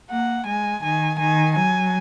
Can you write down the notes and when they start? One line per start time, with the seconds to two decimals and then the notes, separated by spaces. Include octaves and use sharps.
0.10 A#3 F#5
0.46 G#3 G#5
0.83 D#3 G#5
1.19 D#3 G#5
1.55 F#3 G#5